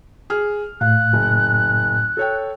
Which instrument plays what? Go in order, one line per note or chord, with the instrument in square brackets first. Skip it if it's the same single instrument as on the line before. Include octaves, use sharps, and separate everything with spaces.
[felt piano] G#4 F6
[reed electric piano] A2 [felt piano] F5 [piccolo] F#6
[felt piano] F#1
A4 C#5 G5